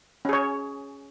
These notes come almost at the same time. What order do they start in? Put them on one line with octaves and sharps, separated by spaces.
C#4 G#4 C#5